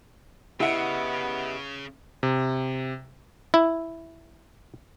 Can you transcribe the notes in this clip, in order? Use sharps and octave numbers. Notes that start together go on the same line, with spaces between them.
C#3 B3 E4 G4 D#5 E5 F#5
C3
E4